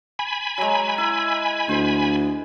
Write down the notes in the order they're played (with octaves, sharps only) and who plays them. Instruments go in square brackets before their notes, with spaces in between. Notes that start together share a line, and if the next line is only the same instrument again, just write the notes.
[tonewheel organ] G#5 B5
[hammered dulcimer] F#3 G#3
E4
[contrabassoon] D2 [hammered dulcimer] C5